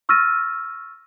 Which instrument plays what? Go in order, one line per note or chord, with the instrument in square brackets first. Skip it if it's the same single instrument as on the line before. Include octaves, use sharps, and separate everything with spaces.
[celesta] C#6 E6 F6 A6 A#6 D#7